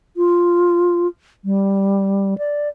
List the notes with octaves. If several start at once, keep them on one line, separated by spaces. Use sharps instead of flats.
F4
G3
D5